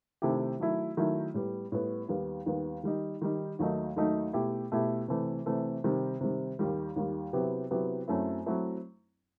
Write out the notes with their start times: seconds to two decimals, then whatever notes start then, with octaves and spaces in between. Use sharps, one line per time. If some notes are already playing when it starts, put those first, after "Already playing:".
0.22 C3 D#3 A3 E4 G4
0.60 D#3 F#3 A3 E4
0.97 D#3 F#3 A3 E4
1.34 A2 G3 B3
1.72 A2 G3 B3
2.09 D#2 D#3 G3 B3
2.46 D#2 D#3 G3 B3
2.83 D#3 G3 D#4
3.22 D#3 G3 D#4
3.59 D#2 D#3 F#3 A3 D#4
3.96 D#2 D#3 F#3 A3 D#4
4.33 B2 A3 E4 G4
4.72 B2 A3 E4 G4
5.08 C3 E3 A3
5.46 C3 E3 A3
5.84 C3 D#3 G3
6.21 C3 D#3 G3
6.59 D#2 D#3 G3
6.96 D#2 D#3 G3
7.33 C3 F#3 B3 E4 G4
7.71 C3 F#3 B3 E4 G4
8.08 F#2 F#3 A3 C4 E4
8.46 F#3 A3 C4 E4